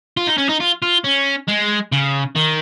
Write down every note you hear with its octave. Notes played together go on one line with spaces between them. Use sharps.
F4
D#4
C#4
D#4
F4
F4
C#4
G#3
C#3
D#3